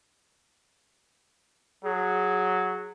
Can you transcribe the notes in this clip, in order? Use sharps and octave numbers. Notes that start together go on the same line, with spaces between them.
F#3 G#4